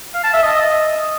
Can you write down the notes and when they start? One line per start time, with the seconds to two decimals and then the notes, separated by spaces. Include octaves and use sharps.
0.14 F5
0.24 A5
0.33 E5
0.43 D#5